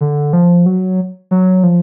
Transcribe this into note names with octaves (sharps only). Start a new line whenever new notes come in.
D3
F3
F#3
F#3
F3